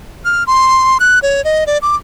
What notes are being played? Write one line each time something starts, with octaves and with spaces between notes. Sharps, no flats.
F6
C6
F#6
C#5
D#5
D5
D6